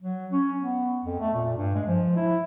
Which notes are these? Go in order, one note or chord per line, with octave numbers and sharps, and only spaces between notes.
F#3
C#4
B3
F2
A3
A#2
G2
G#3
F3
E4